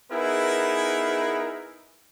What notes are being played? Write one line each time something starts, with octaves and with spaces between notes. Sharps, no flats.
B3 D#4 E4 G#4 A#4 B4